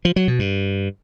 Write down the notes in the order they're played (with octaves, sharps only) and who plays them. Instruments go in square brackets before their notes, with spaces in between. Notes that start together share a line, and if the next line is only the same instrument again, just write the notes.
[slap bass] F3
F#3
B2
G2